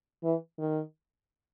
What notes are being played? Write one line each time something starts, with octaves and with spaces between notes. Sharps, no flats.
E3
D#3